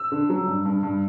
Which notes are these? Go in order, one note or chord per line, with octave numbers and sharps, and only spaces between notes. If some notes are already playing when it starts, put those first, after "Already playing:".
Already playing: E6
D3
F#3
G2
G2
G2